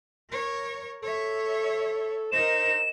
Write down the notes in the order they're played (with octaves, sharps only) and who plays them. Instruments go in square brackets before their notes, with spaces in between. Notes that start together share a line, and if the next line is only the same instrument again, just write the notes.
[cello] A#4 C#5
[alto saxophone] A4 [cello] C#5 E5
[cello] D#4 A#4 [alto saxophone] C5 [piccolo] E7